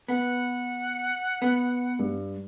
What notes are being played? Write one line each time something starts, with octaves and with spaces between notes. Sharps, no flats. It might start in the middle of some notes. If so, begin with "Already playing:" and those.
B3 F#5
B3
G2